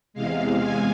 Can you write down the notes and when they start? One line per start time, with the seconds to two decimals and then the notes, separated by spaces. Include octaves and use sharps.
0.14 E2 C3 G#3 F5
0.63 G#5